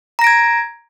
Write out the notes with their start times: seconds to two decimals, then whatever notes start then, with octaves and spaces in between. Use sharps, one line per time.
0.19 A#5
0.21 A#6
0.24 D7
0.27 G#6